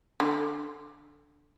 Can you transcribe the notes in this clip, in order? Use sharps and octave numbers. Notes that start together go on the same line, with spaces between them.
D3